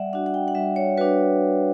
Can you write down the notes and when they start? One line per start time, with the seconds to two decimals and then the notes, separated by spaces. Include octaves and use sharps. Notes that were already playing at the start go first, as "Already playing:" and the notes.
Already playing: G3 D5 E5 F#5
0.13 D4 F#4 F#5
0.26 F#5
0.34 G5
0.48 F#5
0.55 G3 E5
0.76 C#5
0.98 D4 F#4 B4